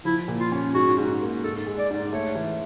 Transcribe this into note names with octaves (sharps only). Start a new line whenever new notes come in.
F3 E4
A#2
F4
C#4
G#2 F#4
G#2
A#3
G#2 A4
G#3
D5
G#2
A3 C#5
E3